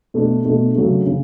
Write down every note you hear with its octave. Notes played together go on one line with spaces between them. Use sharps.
B2 A3 D4
B2 A3 D4
C#3 F#3 A3
C#3